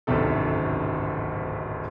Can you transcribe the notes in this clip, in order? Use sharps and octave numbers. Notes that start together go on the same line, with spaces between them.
D1 G#1 C#2 F#2 C3 A4